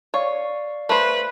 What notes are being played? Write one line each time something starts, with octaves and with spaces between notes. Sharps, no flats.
C#5 D5 F5 C#6
A3 B4 C5